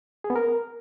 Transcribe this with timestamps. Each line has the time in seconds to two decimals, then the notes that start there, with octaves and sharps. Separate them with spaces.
0.24 G#4
0.30 B3
0.36 A#4